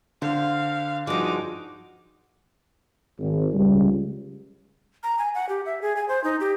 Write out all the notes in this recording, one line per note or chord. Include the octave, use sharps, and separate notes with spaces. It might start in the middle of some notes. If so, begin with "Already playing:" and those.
D3 C5 F5
G2 F3 G#3 D#4 F#4 D6
G#1
C#2 G3
A#5
G#5
F#5
G4
E5
G#4
G#5
C5
D#4
G4